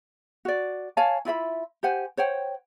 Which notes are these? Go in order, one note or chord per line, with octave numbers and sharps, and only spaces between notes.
F#4 D5
C#5 F5 G#5 A5
E4 F4 E5 B5
G4 C5 F#5 G#5
C5 C#5 F#5 G5